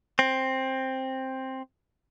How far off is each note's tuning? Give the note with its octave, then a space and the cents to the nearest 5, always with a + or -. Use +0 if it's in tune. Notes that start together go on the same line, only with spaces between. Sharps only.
C4 +10